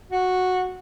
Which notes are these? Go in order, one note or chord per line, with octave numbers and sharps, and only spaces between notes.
F#4